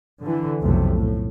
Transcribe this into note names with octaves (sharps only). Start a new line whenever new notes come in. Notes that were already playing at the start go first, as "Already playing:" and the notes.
D3 E3
B1 F2 C3 A3
A2